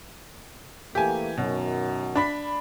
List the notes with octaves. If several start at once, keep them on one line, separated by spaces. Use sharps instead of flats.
E3 A3 A#3 G4 G#5
F#2 B2 D#3 F#3
D4 B5 B6